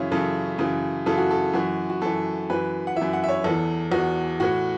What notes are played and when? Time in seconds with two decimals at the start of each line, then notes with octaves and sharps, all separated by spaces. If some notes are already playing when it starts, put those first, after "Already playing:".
Already playing: F#2 C#3 E3 C#5 E5
0.11 F#2 C#3 E3 A4
0.58 F#2 C#3 E3
1.06 F#2 C#3 E3 A4
1.18 F#4
1.31 A4
1.53 F#2 E3 F#4
1.90 F#4
2.02 F#2 E3 A4
2.50 F#2 E3 B4
2.87 F#5
2.96 F#2 E3 E5
3.13 F#5
3.24 E5
3.29 C#5
3.44 E2 A4
3.49 E3
3.92 E2 E3 F#4
4.40 A2 E3 F#4